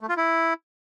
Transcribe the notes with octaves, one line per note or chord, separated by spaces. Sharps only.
A3
F4
E4